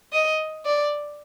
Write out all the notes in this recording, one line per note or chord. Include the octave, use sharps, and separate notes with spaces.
D#5
D5